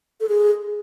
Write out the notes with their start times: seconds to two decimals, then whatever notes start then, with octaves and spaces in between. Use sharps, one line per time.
0.20 A4
0.29 G#4